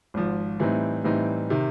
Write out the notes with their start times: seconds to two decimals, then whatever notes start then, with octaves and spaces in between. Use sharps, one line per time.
0.14 G#1 G#2 F3
0.60 A2 E3 G3 C4 D#4
1.04 A2 E3 G3 C4 D#4
1.50 C3 D#3